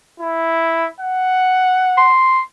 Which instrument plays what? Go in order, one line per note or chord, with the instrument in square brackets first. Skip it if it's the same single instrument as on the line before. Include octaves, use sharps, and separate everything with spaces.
[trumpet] E4
F#5
[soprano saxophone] C6